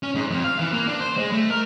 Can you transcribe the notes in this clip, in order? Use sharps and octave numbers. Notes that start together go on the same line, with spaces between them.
C#4
G#2
F2
F5
E3
A#3
D4
C5
G#3
A3
A#4